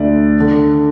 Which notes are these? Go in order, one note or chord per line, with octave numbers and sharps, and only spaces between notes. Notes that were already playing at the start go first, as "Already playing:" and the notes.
Already playing: D2 D3 D5
D3